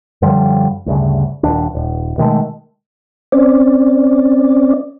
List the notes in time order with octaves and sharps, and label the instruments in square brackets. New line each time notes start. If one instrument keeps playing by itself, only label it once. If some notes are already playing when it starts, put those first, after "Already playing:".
[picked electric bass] F#2 D3 F3 G3
D2 G2 C#3
D#1 D#2 D4
D#1
B2 D#3 G#3 A3
[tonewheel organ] C4 C#4 D5